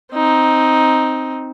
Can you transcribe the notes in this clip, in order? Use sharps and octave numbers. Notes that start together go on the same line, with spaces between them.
C4 D#4